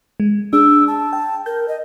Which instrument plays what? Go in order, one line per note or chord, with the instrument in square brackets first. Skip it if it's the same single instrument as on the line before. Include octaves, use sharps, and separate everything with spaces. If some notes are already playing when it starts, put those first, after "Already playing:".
[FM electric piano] G#3
[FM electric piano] D4 G#4 [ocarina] E6
[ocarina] A5
[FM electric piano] G5
[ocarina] A#4 [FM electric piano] G6
[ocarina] D#5